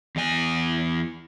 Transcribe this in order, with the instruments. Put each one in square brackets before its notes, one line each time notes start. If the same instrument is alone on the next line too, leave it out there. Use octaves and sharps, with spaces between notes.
[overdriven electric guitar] E2 G#5